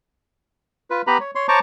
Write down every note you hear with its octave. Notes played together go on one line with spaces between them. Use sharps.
F4 B4
B3 G4 B4 A#5 B5
C#5
C#5 C6
C5 C#5 A5 A#5 C#6 D6